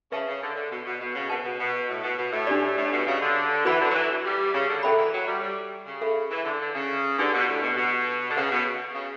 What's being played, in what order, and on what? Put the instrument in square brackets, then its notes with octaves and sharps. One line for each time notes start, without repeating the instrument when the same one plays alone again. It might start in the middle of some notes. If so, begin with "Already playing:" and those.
[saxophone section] C#3 [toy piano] B4 E5 A5 C#6
[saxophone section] C#3
D3
D3
B2
B2
B2
C#3
[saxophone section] B2 [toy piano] B4 F#5 A5
[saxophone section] B2
B2
A2
B2
B2
A2
[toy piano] D4 G4 D5
[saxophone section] A2
B2
C#3
D3
[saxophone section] E3 [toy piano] F#4 B4 F#5 B5
[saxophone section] D3
F#3
E3
G3
C#3
D3
[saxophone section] F#3 [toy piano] A4 E5 G5 B5
[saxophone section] E3
F#3
G3
G3
C#3
[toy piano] A4 E5 B5
[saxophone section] E3
D3
D3
C#3
[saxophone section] D3 [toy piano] D4 G4 B4 D5 F#5
[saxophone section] B2
A2
B2
B2
D3
[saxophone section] C#3 [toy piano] B4 F#5 A5 C#6
[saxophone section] B2
C#3